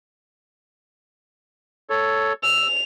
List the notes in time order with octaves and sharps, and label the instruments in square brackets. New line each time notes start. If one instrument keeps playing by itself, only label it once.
[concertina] A4 C#5
[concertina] E6 [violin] F7